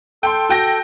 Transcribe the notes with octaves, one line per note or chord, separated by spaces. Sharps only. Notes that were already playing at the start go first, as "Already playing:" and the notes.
A4 G5 C6
F#4 G5 A#6